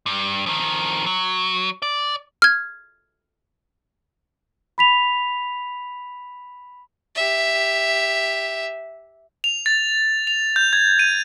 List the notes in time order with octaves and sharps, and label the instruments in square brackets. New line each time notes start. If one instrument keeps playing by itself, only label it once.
[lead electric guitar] G2
F2 D#3
F#3
D5
[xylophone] F6 G#6
[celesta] B5 B6 F7
[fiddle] G4 E5
[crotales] F7
A6
F7
G6
G#6
D#7